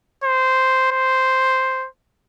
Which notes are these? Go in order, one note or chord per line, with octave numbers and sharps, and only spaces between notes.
C5
C5